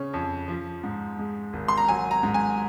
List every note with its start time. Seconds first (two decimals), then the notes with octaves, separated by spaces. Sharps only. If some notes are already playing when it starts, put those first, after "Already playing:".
Already playing: C#3 C#4
0.13 F2
0.48 F3
0.83 G#2
1.19 G#3
1.53 G#1
1.68 C6
1.77 A#5
1.88 F#3 G#5
2.11 A#5
2.23 G#2
2.34 G#5